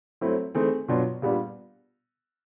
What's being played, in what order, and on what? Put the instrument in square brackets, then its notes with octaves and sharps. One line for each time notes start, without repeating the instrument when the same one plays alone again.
[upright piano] F#3 A3 C4 E4
E3 A3 C4 D#4 G#4
B2 F#3 B3 D4 F4
A#2 G3 B3 D4